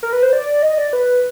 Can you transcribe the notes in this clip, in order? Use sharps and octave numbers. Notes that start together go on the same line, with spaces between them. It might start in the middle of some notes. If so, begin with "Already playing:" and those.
A#4
B4
C5
D5
D#5
D5
B4